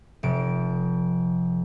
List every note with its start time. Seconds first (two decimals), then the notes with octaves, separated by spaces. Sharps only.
0.23 F1 D7